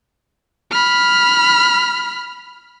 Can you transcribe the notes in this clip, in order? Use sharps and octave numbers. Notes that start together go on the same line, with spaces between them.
B5 F6